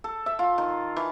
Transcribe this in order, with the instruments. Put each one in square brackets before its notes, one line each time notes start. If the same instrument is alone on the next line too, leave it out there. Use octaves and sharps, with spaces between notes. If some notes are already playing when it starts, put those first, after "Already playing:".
[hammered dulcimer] A4
E5
F4
D#3
E3